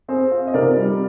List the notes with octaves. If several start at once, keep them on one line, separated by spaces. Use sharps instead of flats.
C4 G#4 C5
F4
D#5
C3 A#4 D5
G3